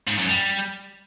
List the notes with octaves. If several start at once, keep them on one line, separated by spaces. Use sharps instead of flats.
G#2
F#2
G3